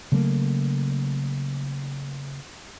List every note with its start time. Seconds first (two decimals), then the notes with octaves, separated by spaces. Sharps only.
0.12 C#3 F#3 A3 A#3